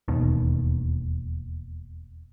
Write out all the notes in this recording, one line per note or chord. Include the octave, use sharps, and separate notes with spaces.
E1 D#2 B2 D#3